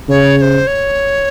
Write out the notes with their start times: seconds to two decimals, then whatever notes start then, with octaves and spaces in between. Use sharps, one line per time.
0.09 C#3 C#5
0.38 C#5
0.42 C5
0.67 C#5